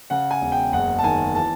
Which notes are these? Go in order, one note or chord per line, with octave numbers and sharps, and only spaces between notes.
C#3 F#5
G#5
E1
G5
F#1 F#5
A5
D#3 G#5
E3 A5